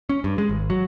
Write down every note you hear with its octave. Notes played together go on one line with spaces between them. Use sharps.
C#4
G2
G#3
G#1
F#3